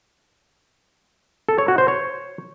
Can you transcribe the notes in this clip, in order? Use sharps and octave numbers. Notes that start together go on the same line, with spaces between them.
A4
C#5
F#4
C5
C#5